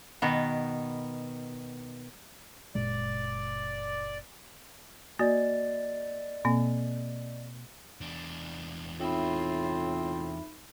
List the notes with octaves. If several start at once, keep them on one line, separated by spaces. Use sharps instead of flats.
B2 D#3 B3
F#1 A#2 G#3 D5
A#3 F#4 D5 D#5 A6
B2 A#3 C4
E2 D4
A2 C4 D#4 F4 E5 B5